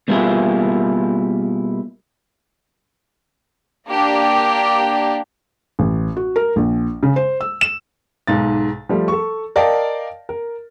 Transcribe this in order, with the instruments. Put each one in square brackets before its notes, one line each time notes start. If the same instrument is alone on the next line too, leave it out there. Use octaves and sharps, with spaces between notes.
[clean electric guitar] B2 G3 A#3 E4 F4 G#4
[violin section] A#3 D4 G4
[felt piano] A1
F#4
A#4
A#1
C#3
C5
E6
E7
[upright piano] B1 G#2 A6
F3 G3 A3
A4 C#6
A#4 D5 D#5 F5 G5 A5
A#4